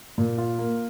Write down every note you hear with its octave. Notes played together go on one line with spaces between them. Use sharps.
A#2
F4
A#3